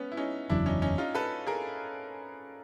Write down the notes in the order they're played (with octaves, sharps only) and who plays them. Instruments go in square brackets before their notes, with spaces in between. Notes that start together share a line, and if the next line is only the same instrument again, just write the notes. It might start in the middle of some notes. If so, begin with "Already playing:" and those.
Already playing: [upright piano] B3 C#4
E4
C#4 D#4
[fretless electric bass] F#1 E2 C#3 F#3 [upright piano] D4 E4
[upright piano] C#4 D#4
C#4 D#4
D#4 F4
A4 B4
G#4 A#4